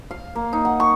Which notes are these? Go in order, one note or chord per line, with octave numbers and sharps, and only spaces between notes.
F5
A#3
D#4
F#5
C#6